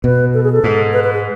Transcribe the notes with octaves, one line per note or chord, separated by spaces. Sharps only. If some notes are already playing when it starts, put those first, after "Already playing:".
B2 B4
A4
G#4
A4
G#2
B4
B4
G#4